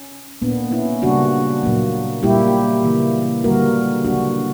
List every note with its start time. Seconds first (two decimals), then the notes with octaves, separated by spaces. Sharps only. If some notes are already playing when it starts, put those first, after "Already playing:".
Already playing: C#4
0.42 A#2 A#3 B3 D4
0.72 C#4 E4
1.02 C#3 G3 A#3 D4 F#4
1.63 A#2 F#3 A#3
2.23 A#2 G3 A#3 E4 G4
2.83 C#3 E3 A#3
3.44 D3 G3 A#3 F#4 A#4
4.05 C#3 F#3 A#3 D4 F#4